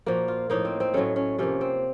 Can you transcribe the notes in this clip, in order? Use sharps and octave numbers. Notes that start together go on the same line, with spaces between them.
A#2 F3 A#3 F#4
F4
A2 F3 A#3 D#4
C4
C4
A2 F#3 A3 C#4
C#4
C3 F3 A#3 C#4
C4